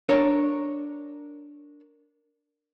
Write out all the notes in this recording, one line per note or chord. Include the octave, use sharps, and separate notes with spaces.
D4 A#4 C#5